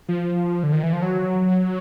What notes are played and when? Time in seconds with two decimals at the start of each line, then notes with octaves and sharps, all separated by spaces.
0.09 F3
0.63 D3
0.72 D#3
0.83 E3
0.93 F3
1.02 F#3